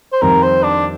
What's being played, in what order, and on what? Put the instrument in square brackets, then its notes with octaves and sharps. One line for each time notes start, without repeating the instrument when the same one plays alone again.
[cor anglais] C5
[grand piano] F2 D#3 G3 C4 [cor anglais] A#4
[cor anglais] C5
D4